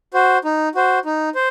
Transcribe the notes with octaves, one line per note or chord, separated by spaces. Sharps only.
F#4 C5
D#4
F#4 C5
D#4
C5